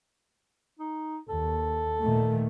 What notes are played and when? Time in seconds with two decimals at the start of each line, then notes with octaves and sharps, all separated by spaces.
0.79 D#4
1.29 D#2 A4
2.00 A#2 D#3 A3